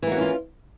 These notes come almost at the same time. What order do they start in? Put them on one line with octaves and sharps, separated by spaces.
E3 A#3 F#4 C#4 F4